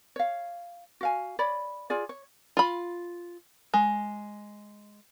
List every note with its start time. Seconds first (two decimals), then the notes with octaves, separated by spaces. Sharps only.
0.16 C#5 F5
1.01 F#4 F5 G#5
1.39 C#5 D5 B5
1.90 F4 G#4 D5
2.09 C#5
2.57 F4 B5
3.74 G#3